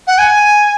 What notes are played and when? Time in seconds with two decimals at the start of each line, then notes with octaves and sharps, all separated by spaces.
0.07 F#5
0.18 G#5